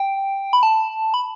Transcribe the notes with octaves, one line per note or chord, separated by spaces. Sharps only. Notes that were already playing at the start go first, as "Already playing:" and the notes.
Already playing: G5
B5
A5
B5